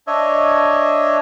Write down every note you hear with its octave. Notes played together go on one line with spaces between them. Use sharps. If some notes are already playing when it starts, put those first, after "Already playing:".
D4 C#5 D#5 E5